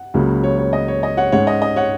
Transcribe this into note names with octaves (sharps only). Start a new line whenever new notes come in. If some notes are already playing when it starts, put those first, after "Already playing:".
Already playing: F#5
C#2 C#3 F#3 A#3
C#5
C#5
D#5
C#5
D#5
C#5 F#5
G#2 G#3 C#4 C#5 F#5
D#5
D#5
C#5 F#5